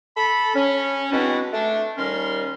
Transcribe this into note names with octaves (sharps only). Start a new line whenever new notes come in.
A4 B5
C#4
G#3 B3 C4 D4 E4 F#4
A3 D4
D#2 D#3 G3 C#4 A#4 C6